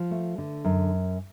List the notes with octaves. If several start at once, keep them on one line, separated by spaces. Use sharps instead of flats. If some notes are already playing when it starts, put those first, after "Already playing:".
Already playing: F3
A3
D3
F#2